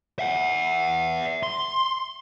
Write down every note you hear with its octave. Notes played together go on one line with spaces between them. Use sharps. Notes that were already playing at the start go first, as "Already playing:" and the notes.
E5 F#5
C6